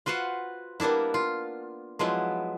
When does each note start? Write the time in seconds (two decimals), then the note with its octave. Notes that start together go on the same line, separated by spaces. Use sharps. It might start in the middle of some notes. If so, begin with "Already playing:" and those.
0.06 F4 F#4 B4 C5 F#5
0.80 G3 A#3 B3 D4 E4
1.14 F4
1.99 F3 F#3 G#3 B3 E4